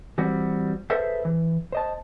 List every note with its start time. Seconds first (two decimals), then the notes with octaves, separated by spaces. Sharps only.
0.18 E3 G3 C4 F#4
0.90 G#4 A4 B4 C5 E5
1.25 E3
1.72 C5 D#5 A5